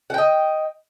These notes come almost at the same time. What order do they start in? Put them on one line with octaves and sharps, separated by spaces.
F#5 G5 D#5